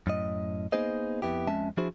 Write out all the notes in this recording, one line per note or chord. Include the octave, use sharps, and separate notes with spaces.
F#2 A2 D#5
A#3 B3 D#4 G#4 C5 D#5
F2 B3 E4 G4
F2 G#3 C#4 E5 A5
F3 D4 E4 F#4 G#4 C5